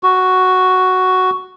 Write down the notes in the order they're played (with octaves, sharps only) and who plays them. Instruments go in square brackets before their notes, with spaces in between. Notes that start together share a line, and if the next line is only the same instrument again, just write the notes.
[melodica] F#4